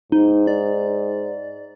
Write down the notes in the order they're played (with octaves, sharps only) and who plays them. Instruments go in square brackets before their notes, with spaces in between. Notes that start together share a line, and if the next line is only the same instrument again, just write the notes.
[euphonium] G#2 [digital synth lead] D#4
[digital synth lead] D5